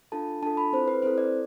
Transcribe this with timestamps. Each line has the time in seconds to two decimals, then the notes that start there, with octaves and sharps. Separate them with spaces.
0.12 D4 F4 A4 A5
0.42 D4 F4 A4 A5
0.57 B5
0.73 C4 E4 A4 C5
0.88 B4
1.02 C4 E4 A4 C5
1.18 D5